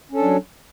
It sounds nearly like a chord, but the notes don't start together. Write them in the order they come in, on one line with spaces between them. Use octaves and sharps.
C#4 A4 D4 F#3